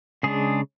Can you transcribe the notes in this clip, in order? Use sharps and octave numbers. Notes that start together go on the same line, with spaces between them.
C#3 G#3 D4 G#4